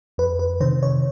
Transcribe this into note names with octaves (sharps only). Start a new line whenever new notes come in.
F2 B4
B4
C3 D#3 C5
C#5